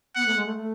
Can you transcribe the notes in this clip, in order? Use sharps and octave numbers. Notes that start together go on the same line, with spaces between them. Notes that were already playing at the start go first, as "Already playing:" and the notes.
B3 F#5
A3
G#3
A3
A3